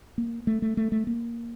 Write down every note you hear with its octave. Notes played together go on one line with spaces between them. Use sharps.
A#3
A3
A3
A3
A3
A#3